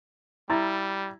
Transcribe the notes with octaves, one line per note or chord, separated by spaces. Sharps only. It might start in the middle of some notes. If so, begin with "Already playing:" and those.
G3 E4 A#5 A6